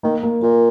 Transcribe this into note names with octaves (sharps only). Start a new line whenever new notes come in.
D#3 A#3
A#3
A#2 A#3